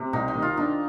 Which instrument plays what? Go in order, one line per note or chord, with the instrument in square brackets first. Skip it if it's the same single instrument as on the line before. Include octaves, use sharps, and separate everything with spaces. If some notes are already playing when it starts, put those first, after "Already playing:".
Already playing: [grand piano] C3 [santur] C4
[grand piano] C2 [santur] D#4
[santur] D#4
[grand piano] D#3
[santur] F4
[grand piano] D4 [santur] D#4